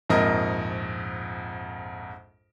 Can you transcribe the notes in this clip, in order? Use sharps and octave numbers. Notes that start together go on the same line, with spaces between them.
A#1 F2 G#2 A#4 D#5 A#6